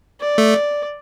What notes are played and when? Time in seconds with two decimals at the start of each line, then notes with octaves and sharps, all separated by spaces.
0.20 D5
0.38 A3